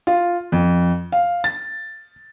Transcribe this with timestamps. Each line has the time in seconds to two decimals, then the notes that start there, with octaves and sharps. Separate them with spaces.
0.07 F4
0.52 F2
1.12 F5
1.44 A6